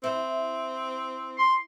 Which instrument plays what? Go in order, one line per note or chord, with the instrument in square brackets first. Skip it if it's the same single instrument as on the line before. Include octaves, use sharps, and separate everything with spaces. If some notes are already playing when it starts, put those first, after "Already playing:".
[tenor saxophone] C4 [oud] E4
[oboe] C6